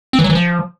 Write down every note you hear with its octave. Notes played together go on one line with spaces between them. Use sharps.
C4
E3
F#3
E3
F3